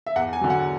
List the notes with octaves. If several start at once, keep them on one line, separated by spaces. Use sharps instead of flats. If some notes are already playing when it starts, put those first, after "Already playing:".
E5
E2 F#5
G#5
D3 F#3
F#5